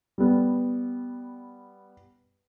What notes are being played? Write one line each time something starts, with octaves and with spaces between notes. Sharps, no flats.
G3 B3